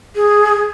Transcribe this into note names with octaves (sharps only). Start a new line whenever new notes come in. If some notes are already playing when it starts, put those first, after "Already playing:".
G#4